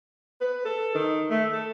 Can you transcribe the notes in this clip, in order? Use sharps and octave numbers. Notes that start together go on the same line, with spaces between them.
B4
A4
D#3
A3
A4